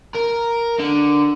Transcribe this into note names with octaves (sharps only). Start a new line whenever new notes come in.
A#4
D3